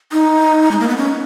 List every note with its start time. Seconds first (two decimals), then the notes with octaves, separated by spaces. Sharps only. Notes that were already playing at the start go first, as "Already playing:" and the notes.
0.12 D#4
0.71 G#3
0.80 A#3
0.89 B3
0.97 C#4